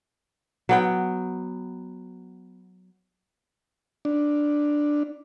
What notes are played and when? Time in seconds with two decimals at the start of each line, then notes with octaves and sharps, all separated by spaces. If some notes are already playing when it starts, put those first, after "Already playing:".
0.69 F#3 B3 G5
4.05 D4